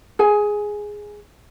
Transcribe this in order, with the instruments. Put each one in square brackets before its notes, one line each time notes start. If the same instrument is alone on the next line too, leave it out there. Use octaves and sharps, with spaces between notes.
[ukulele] G#4 G#5